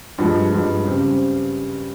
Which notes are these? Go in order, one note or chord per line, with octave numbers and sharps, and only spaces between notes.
G2 F3 G#3
G2 F3 G#3
C#3 G3 C4